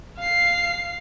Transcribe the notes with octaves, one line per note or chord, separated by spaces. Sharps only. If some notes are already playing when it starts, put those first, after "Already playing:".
F5 C7